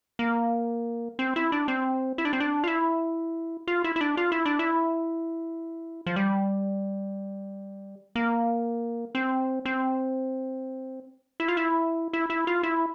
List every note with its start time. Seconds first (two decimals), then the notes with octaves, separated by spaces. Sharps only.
0.19 A#3
1.19 C4
1.36 E4
1.52 D4
1.68 C4
2.18 E4
2.25 D4
2.33 C4
2.40 D4
2.64 F4
2.67 E4
3.67 F4
3.84 E4
3.96 E4
4.01 D4
4.17 F4
4.32 E4
4.45 D4
4.59 E4
6.06 F3
6.16 G3
8.16 A#3
9.15 C4
9.65 C4
11.40 E4
11.48 F4
11.57 E4
12.13 E4
12.30 E4
12.47 F4
12.63 E4